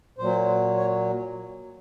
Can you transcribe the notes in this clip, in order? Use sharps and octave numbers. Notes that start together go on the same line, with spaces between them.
A#2 F#3 C5
C#5